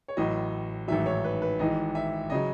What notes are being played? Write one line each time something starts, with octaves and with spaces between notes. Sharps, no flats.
C#5
A1 A2 F#3 D#5
A1 G#2 D#3 F#3 E5
C#5
B4
B4
G#1 G#2 E3 D#5
E5
C#3 F#3 D#5